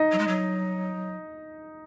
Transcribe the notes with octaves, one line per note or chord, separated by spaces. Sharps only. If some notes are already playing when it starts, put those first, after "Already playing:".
Already playing: D#4 D#5
F#3
G#3
F#3